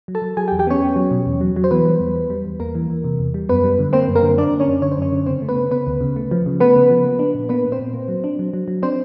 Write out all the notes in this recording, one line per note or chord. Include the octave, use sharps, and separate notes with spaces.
F#3
A4 A5
F#3
F#3 G#4 G#5
G4 G5
E2
G4 G5
B3 C#4 C#5
B3
F#3
B2
E2
F#3
F#3
C5
E3 B3 B4
G3
E2
G3
G3
E2
E2 A#3 A#4
E3
E3
C3
E2
G3
F#2 B3 B4
G3
D3
A#3 C4 C5
F#2
A#3 A#4
D3
A#3 D4 D5
D3
C#4 C#5
F#2
D3 C#5
C5
F#2 C#4 C#5
D3
C#3 C4 C5
A3
B3 B4
C#3
C#3 B3 B4
D2
C#3
A3
F3
C#3
A3 B3 B4
C#3
F3
A#3
D4
A#2
A#3 B3 B4
A#2
C4 C5
A#2
A#3
F#3
D4
F#3
F#3
F#3
C4 D4 C5